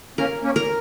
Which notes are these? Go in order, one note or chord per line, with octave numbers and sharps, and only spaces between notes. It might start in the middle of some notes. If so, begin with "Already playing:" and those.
A#3 C#4 A#4
A#3 C#4
A#4